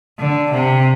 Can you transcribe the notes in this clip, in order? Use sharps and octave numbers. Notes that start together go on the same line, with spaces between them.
D3
C3